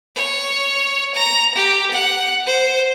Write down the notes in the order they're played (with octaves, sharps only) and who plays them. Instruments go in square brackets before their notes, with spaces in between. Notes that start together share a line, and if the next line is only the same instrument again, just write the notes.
[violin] C#5
A#5
G4
F#5
C5